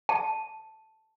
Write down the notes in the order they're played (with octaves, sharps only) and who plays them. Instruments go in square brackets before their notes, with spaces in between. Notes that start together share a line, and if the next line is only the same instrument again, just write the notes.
[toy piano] A5